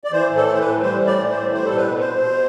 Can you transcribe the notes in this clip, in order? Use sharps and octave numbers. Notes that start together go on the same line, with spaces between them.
D5
E3 C5
A2
A4
E3
C5
B4
A2
G3 C5
A2
D5
E3
C5
A2
G3 C5
A4
B2
B4
B2
C5
B2
B2